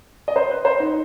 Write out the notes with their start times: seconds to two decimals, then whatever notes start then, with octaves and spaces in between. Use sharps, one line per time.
0.28 D#5
0.36 C5
0.50 B4
0.65 C5
0.80 D#4